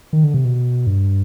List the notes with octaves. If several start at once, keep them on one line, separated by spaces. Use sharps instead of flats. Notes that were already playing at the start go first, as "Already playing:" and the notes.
D#3
D3
C3
B2
G2